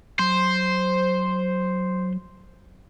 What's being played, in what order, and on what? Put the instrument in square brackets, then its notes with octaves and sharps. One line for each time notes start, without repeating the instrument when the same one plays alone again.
[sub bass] F#3 [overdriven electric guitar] C5